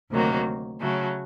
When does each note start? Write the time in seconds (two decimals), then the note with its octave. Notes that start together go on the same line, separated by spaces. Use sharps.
0.10 D2 C3 D#3 F#3 A#3
0.80 C#3 F#3 A3